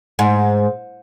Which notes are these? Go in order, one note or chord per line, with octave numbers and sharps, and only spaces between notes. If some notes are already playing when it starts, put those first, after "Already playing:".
G#2